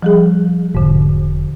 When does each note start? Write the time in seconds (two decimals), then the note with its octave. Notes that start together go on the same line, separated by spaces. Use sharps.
0.02 F3 G3 G#4
0.75 E1 G#2 D3